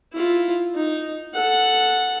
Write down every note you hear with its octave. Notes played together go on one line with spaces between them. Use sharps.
E4 F4
D#4
A4 F#5